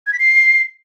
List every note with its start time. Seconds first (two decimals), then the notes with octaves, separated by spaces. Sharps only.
0.07 G#6
0.13 B6
0.19 C7